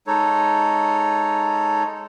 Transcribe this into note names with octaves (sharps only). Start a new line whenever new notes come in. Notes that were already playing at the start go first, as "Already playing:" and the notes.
G#3 D#4 A4 C#5